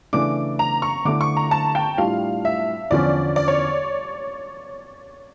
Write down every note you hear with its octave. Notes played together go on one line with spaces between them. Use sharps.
C#3 E3 A3 D4 D6
A#5
C#6
D3 A3 E4 D6
C#6
A#5
A5
G5
A2 G3 D4 F4 F5
E5
E2 D3 F3 C#4 D5
D5
C#5